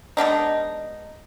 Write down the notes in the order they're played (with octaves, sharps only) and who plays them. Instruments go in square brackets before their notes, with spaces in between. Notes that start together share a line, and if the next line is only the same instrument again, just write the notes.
[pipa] G#3 B3 D4 D#4